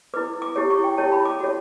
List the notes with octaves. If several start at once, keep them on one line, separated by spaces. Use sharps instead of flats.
E4 B4 D6
D6
E4 G4 C#5 D6
C#6
G5
E4 G4 C#5 A5
B5
D6
F#4 C#5